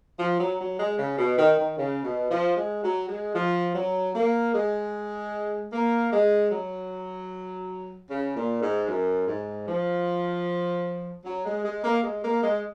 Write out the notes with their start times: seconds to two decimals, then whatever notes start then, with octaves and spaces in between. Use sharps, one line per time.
0.19 F3
0.40 F#3
0.60 F#3
0.79 G#3
0.99 C#3
1.18 B2
1.38 D#3
1.57 D#3
1.78 C#3
2.04 B2
2.31 F3
2.57 G#3
2.83 F#3
3.09 G#3
3.35 F3
3.75 F#3
4.15 A#3
4.55 G#3
5.73 A#3
6.12 G#3
6.51 F#3
8.10 C#3
8.36 A#2
8.62 G#2
8.88 F#2
9.28 G#2
9.68 F3
11.25 F#3
11.45 G#3
11.64 G#3
11.84 A#3
12.04 G#3
12.24 A#3
12.43 G#3